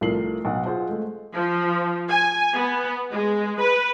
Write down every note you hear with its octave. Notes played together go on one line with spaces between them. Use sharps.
C2 F3 A3 A#4 C7 F#7
B1 F5 F#5
F4 G#4 C5 F#5
G#3 A3
F3
G#5
B3
G#3
B4